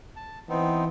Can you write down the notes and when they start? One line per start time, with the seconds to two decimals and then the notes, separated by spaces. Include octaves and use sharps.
0.16 A5
0.49 E3 B3 C4 D#4